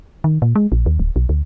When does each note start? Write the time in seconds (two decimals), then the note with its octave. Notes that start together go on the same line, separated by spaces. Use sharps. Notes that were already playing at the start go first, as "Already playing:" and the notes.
0.24 D#3
0.42 A#2
0.56 G#3
0.72 A#1
0.86 D#2
0.99 D1
1.16 B1
1.29 D2